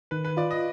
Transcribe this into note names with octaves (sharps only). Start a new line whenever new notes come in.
D#3 B4
B4
F4 D5
D#5